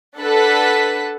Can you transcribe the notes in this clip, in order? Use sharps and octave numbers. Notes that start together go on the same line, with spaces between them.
D4 A4 B4 F#5 F#6 B6